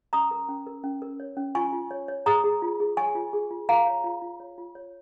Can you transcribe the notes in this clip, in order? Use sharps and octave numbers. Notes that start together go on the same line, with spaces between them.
C#4 A#5 D#6
A#4
C#4
A#4
C#4
A#4
C#5
C#4
F4 G#5 C#6
F4
C#5
C#5
G#4 A#5 D#6
G#4
F4
G#4
C#5 G#5 C#6
F4
G#4
F4
F4 F5 A#5
C#5
F4
F4
C#5
F4
C#5